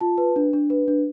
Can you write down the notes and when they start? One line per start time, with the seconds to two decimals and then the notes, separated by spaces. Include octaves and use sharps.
0.01 F4 A5
0.18 B4
0.36 D4
0.53 D4
0.70 B4
0.88 D4